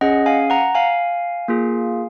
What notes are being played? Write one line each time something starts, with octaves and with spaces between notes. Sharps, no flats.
C#4 G#4 D#5 F#5
F5 G#5
F#5 A#5
F5 G#5
A#3 F4 G#4